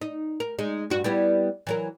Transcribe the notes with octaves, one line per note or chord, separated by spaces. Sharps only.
D#4
A#4
G#3 D#4
G2 F#4
G3 B3 E4
E3 F#3 A#4